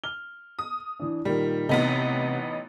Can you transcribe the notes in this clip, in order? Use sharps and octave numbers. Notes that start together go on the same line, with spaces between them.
F6 G7
D#6
E3 D4
A#2 D#3 G3 A#4
A1 C3 B3 D#4